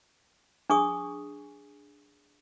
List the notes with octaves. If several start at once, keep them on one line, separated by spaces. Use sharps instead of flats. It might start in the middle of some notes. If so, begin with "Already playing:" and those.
D4 G#4 C#6 D#6